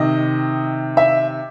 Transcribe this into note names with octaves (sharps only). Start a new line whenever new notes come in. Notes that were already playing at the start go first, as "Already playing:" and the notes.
Already playing: C3 D#3 D#5
E5